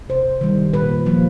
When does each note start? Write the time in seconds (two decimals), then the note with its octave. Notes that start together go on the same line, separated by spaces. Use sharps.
0.09 C3 C5
0.41 D#3 G3
0.74 A#2 B4
1.06 F3 A#3